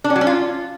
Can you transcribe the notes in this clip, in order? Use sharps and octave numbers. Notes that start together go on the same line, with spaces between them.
D4
C#4
F#3
C#4
F4